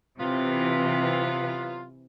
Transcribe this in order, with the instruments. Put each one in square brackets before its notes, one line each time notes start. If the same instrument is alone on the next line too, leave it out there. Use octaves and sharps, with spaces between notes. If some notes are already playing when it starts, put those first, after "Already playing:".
[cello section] C3 E3 [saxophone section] F#3 B3 F4